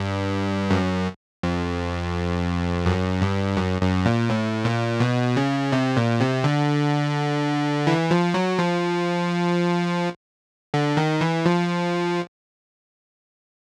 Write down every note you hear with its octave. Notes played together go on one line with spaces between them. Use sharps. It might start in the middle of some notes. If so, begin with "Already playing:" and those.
Already playing: G2
F#2
F2
F#2
G2
F#2
F#2
A#2
A2
A#2
B2
C#3
C3
A#2
C3
D3
E3
F3
F#3
F3
D3
D#3
E3
F3